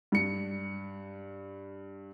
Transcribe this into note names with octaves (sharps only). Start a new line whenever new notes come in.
G2 C#7